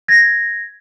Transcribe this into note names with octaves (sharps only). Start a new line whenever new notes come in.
G#6 A#6